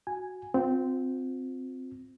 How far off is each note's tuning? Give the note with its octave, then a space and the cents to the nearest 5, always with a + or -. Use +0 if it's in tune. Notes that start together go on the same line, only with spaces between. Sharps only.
F#4 +0 G#5 +0
C4 -10 F4 +35